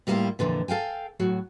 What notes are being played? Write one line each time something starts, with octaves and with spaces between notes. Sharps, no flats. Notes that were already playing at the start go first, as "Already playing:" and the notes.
A2 G3 A#3 D4 E4 F4
F2 A#2 D3 E3
A4 F5 G5 G#5
A2 F#3 F#4